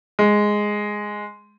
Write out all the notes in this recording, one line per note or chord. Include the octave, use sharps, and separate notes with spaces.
G#3